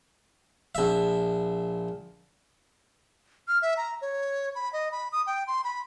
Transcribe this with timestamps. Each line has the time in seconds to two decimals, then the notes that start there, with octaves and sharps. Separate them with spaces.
0.75 A#1 E5
3.48 F6
3.62 E5
3.77 A#5
4.01 C#5
4.55 B5
4.73 D#5
4.92 B5
5.12 D#6
5.27 G5
5.47 C6
5.64 B5